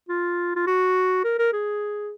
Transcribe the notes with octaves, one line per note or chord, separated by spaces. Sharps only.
F4
F4
F#4
A#4
A#4
G#4